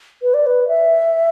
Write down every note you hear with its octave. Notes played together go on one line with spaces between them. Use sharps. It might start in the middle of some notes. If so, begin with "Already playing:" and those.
B4
D5
B4
E5